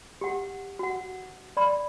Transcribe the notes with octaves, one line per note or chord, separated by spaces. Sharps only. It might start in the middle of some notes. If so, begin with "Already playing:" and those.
G4 F#5
F#4 F#5
D5 B5 C6